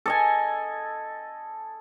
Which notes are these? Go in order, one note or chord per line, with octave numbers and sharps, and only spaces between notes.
A4 D#5 G#5